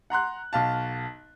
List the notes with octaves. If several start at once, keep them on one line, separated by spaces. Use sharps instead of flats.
F#5 A#5 C6 F#6
B1 F5 A5